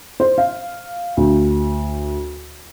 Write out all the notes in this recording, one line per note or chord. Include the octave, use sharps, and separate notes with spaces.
C5
F5
D2